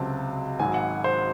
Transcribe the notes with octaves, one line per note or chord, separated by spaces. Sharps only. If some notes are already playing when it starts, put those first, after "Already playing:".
Already playing: C#2 C3 F#3 C4 A5
G#1 G#2 F#3 G#5
F#5
C5